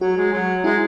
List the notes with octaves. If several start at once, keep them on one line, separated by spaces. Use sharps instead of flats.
F#3 F#4
G#3
F#3
G#3 E4